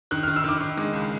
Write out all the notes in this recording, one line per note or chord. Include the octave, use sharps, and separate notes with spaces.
D#3 F#6
D#3 F6
E6
D#3 D6
D#3
G#3
C#2